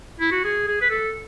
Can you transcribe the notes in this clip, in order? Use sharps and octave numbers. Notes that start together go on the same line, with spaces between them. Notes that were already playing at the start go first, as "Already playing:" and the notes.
E4
F#4
G#4
G#4
B4
A4